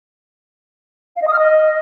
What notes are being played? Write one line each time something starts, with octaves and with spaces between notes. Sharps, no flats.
F5
D#5
D#6
F6
D#5